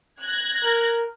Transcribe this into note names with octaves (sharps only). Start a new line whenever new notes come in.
F#6 G#6 A#6
A#4